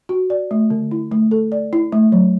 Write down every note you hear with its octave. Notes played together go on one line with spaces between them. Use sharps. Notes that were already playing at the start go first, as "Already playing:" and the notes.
F#4
D5
A3
D3
E4
A3
A4
D5
E4
A3
F#3